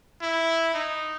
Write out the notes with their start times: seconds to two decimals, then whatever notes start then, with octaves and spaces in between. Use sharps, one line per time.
0.22 E4
0.74 D#4